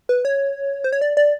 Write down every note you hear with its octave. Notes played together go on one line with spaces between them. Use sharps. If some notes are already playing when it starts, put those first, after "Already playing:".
B4
C#5
C5
C#5
D5
D5